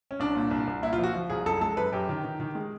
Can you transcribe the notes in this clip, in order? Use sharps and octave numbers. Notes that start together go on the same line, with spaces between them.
C#4
C2 D4
A#2
C2
C2
A#2 E4
F4
F3
F#4
F3
C2 G#4
F#2 A4
G#3 A4
F#2 B4
F#2 G4
D#3
D#3
D#3
G#3